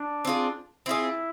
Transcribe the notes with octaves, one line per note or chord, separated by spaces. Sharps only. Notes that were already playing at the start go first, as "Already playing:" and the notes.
Already playing: D4
C4 F4 G#4
C4 E4 F4 G#4